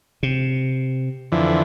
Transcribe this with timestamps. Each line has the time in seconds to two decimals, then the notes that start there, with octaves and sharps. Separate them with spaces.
0.23 C3
1.32 F2 D3 E3